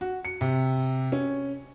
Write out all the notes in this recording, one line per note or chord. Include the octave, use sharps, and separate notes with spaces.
F#4
C#7
C3
C#4